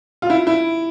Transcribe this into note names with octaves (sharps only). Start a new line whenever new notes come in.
F4
E4
E4